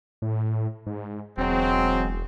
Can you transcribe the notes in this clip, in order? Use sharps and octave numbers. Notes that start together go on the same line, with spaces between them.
A2
G#2
E1 F#3 G#3 C4